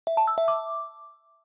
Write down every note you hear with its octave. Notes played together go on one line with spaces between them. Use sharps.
E5
A5
E6
E5
D6